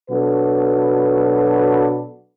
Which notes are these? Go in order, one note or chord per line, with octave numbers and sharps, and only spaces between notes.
B2 F#3 D4 F#4 A4 B4